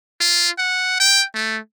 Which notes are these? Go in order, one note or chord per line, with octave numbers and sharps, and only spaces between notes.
F4
F#5
G5
A3